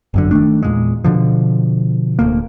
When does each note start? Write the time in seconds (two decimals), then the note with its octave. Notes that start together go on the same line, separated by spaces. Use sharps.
0.14 G1 F#2 D3
0.31 D#3 F3 A3 D4
0.63 E2 A#2 G#3
1.04 B2 D3 F3
2.19 D1 D2 A#3